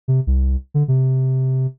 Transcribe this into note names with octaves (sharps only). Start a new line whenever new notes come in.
C3
C2
D3
C3